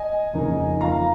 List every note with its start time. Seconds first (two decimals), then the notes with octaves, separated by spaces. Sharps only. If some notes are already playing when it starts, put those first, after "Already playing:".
Already playing: D#5 G#5
0.33 F2 C#3 A#3 D#4
0.81 F2 F3 A#3 F5 A#5